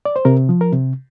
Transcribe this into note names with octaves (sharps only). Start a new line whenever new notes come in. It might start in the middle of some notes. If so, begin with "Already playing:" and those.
D5
C5
C3 A#4
F3
A#4
C3